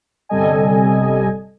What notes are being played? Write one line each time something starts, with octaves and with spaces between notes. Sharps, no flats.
G1 C3 G3 A4 D#5 G#5